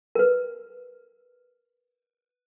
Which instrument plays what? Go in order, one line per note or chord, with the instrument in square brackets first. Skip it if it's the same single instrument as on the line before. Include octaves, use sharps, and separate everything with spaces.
[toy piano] A#4 B4